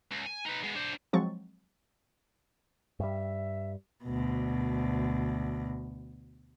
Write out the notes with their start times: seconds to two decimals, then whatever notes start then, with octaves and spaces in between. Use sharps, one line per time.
0.11 C#2
0.26 G#5
0.45 D#4 B4
0.63 G#3 B3
0.75 D4 C5
1.13 F3 F#3 G#3 C4 C#6 A6
3.00 G2 G3 E5
4.05 D2 B2